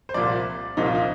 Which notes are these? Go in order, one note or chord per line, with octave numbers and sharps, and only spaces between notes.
C5
C2 A#2 F3 D5
C2 A#2 F3 D#4
F4
D#4